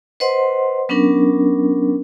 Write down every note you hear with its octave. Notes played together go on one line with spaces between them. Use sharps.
B4 C5 D#5 F#5 C6
F#3 B3 C#4 D4 A#4